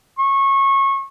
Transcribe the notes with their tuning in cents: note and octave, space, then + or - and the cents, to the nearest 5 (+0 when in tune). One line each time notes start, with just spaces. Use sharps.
C#6 -25